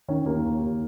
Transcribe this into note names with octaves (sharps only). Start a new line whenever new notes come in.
D#3 C#4
D#2 A#3
D#3
D#2